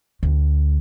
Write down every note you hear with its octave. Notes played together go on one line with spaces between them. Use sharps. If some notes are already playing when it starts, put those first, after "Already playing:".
D2